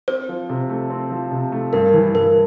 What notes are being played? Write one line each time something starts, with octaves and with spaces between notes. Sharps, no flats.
C4 C5
F3
C3
A3
C4
F3
C3
A3
G2 A#4
E3
G2 A#4